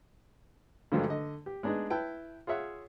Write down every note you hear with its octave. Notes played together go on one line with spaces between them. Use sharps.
G2 D3 F3 F#3 G#3 A3
D3 D#5
G4
G#3 B3 D4 D#4 G#4
E4 B4 G5 A5
F4 G#4 C#5 E5 F#5